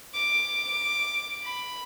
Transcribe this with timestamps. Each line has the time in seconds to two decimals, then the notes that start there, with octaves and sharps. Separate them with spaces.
0.14 D6
1.44 B5